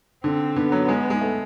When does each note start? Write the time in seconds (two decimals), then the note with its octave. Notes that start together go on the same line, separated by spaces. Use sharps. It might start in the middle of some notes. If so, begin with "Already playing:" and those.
0.24 D3 C4
0.56 D3 B3
0.72 F#3
0.88 G#3
1.10 G#3
1.21 A3